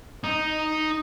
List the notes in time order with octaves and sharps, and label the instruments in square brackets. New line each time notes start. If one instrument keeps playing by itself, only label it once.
[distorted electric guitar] D#4